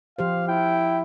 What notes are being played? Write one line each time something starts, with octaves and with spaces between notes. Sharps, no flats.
F3 G4 C5 F5
E4 G5